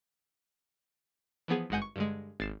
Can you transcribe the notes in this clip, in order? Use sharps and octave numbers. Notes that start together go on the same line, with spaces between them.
E3 F3 B3 G#4
G#1 G2 G#3 F#5 G#5 G6
C#6
G2 D3 G#3
G#1 A6 C7 E7